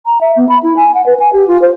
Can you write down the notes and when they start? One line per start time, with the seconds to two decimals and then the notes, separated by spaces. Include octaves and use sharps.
0.06 A#5
0.21 E5
0.36 B3
0.49 B5
0.63 E4
0.77 G#5
0.95 F#5
1.06 B4
1.20 G#5
1.33 G4
1.48 F4
1.62 C5